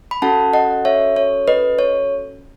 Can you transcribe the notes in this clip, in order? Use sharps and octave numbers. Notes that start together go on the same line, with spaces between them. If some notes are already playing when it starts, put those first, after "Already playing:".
B5
C#4 F#4 A4 F#5 A5
D#5 F#5
C#5 E5
C#5
B4 D#5
C#5